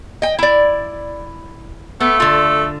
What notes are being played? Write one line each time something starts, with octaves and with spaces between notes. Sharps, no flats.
D#5 G5
E4 D5
A3 B3
D3 F4